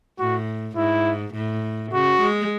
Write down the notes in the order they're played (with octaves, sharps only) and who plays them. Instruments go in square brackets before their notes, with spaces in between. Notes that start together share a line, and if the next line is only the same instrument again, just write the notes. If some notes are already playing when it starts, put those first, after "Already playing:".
[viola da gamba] A2 [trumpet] F#4
[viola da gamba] G#2 [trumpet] E4
[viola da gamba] A2
[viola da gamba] C#3 [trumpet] F#4
[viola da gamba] G#3